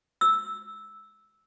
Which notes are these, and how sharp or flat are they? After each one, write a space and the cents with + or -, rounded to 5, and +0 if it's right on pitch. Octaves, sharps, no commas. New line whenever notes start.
E6 -5